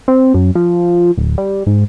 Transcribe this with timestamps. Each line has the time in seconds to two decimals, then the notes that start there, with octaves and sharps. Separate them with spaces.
0.08 C4
0.34 F#2
0.55 F3
1.17 D1
1.38 G3
1.66 G#2